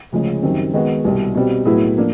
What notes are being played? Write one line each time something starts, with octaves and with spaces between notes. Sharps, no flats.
D2 C#3 F3 G#3 C#4
F#2 D#3 G3 C4
D#3 G#3 B3 D#4 F#4
C2 B2 G3
B2 G3 C4
A2 F#3 B3 E4 G#4
F3 A#3 D4